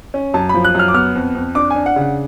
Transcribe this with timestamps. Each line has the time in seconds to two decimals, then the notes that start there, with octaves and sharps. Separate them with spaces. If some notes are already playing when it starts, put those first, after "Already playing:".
0.14 C#4
0.34 F#2 A5
0.49 F3 B5
0.65 F#6
0.74 F#2 F6
0.88 D6
0.94 B3 F6
1.15 F2
1.35 F2
1.55 D4 D6
1.70 G#5
1.76 D4
1.86 F#5
1.96 C#3 F#5